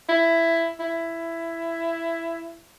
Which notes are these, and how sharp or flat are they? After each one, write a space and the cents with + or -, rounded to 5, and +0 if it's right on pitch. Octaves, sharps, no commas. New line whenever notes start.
E4 +10
E4 +10